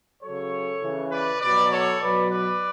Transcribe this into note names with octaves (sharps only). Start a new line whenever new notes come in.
C#3 F#3 A4 C#5
C#3 E3
B4 D5
B2 F#3 B4 D5
A4 C#5
B2 F#3 B4 D5
B4 D5